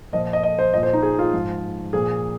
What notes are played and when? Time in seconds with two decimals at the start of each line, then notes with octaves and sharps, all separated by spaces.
0.13 A#2 F3 D#5
0.33 D#5
0.43 D#5
0.59 C5
0.73 A#2 F3 D#5
0.83 C5
0.93 D#4
1.03 G#4
1.19 F4
1.33 G#2 F3
1.93 A#2 F3 G#4